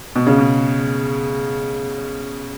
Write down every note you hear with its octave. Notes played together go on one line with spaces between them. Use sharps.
B2
C#3
B2